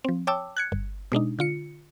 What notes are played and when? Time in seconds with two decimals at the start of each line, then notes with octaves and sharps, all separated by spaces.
0.04 F3 C4
0.27 C#5 G5 A5 D6 E6
0.57 F#6 G#6 C#7
0.72 G1
1.12 B2 G#3 D4 D#4
1.39 D3 F4 C#7